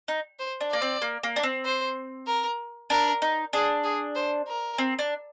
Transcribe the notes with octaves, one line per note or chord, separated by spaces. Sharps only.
D#4
C5
D4
A#3 D5
C4
A#3
A#3
D4
C4
C5
A#4
D4 A#4
D#4
D4 G#4
G#4
C5
A#4
C4
D4